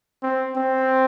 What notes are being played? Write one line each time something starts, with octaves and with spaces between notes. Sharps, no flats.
C4
C4